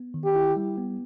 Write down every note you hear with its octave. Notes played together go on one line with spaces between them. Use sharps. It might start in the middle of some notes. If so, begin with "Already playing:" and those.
Already playing: B3
D#3
G4
E4
G3
B3